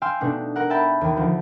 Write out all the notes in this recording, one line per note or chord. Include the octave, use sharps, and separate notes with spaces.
F5 G5 G#5 C6 E6
B2 A3 D4 D#4
A#4 F#5
E5 G5 A5 B5
D#2 D#3
D2 F3